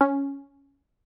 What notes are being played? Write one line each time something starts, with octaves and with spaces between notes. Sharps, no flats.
C#4